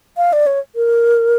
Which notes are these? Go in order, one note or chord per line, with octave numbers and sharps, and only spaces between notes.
F5
D5
C#5
A#4